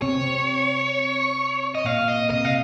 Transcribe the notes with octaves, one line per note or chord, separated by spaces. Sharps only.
C3 C4 C#5
D#5
A#2 A#3 F5
D#5
C3 D#5
F5